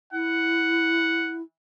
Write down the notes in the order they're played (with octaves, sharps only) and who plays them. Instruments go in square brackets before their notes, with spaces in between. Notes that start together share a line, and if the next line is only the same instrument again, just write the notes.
[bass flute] E4 [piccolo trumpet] F#5